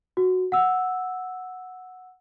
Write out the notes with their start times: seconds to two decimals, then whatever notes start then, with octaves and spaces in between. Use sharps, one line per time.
0.17 F#4
0.52 F#5 E6